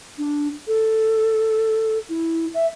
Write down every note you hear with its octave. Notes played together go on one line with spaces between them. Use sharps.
D4
A4
E4
E5